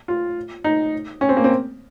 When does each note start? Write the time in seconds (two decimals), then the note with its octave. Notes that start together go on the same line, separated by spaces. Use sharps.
0.08 F4
0.64 D#4
1.21 C#4
1.29 C4
1.37 A#3
1.44 C4